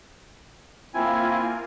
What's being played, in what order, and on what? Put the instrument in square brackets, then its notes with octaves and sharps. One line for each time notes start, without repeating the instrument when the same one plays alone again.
[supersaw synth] A#3 F4 [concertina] C4 E4 G#5